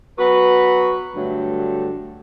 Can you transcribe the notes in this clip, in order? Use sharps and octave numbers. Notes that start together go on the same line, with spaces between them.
F#3 B3 F#4 B4
G2 D3 F#3 A3